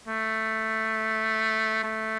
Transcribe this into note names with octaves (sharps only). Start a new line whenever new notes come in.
A3
A3